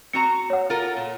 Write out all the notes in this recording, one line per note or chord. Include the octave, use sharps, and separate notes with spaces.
C4 F#4 A#5 C#7
C#5 F#5
F4 A4 A#4
A#2